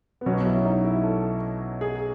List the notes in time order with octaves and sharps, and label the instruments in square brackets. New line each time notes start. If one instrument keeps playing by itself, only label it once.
[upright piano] B3
[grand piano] B1 B2 F#3 [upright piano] C#4
[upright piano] E4
D#4
E4
A4
G#4